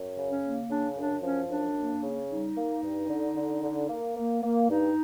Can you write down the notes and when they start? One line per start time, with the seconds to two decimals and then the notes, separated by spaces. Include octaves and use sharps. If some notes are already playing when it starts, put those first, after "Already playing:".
Already playing: F#2
0.17 C#3
0.29 C#4
0.43 A#3
0.69 C#3 D4
0.97 F#2 D4
1.23 F3 C#4
1.49 F#2 D4
1.76 A#3
2.03 C#3
2.30 G3 D#4
2.56 A#3
2.83 G2
3.09 D3
3.36 D3
3.63 D3
3.89 A#3
4.17 A#3
4.43 A#3
4.69 G2 D#4